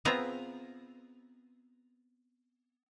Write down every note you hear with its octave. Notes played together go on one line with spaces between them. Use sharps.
B3 C4 F4 G#4 E5 A#5